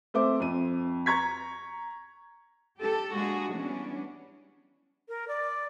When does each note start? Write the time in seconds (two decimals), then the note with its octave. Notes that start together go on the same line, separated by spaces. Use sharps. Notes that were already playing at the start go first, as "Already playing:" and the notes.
0.14 A3 C4 C5 E5 D6
0.40 F2 D#7
1.06 A#5 C#6 G#6 B6
2.79 G4 A4
3.14 G#3 A#3 D4 F#4 G#4
3.56 E3 G3 B3 C#4 D4
5.09 A#4
5.28 D5